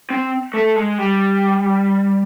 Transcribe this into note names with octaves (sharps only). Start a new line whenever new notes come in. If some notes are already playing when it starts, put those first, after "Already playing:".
C4
A3
G#3
G3